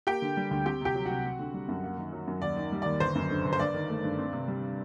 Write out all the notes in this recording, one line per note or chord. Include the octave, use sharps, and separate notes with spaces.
A#3 G4 G5
D3
G3
D2
C4 G4 G5
C3 G4 G5
F#3
C2 F#4 F#5
C4
D3
G3
F#2
A#3
D#3
F#3
F#2
D#2 D5
D#3
G3
D#2 D5
G1 C5
F#2
D3
G1
C5
G2 D5
D#3
A3
G2
C4
C3
G3